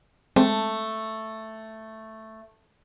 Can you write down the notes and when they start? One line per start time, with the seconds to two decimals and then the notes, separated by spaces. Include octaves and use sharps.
0.36 G#3 A3 C4